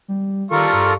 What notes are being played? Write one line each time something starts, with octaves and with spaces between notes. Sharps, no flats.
G3
D#3 G3 F4 A4 A#4 F5 C#6
G2